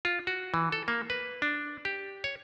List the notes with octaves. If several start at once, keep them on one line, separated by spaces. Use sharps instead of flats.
F4
F#4
E3
A4
A#3
B4
D4
G4
C#5